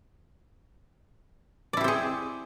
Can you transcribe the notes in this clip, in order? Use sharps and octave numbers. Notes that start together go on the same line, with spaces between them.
C4 E4 G4 G#4 D5